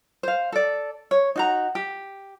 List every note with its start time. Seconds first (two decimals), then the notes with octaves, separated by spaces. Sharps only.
0.23 C5 F5
0.52 A4 D5
1.11 C#5
1.36 D#4 F#4 A#5
1.75 G4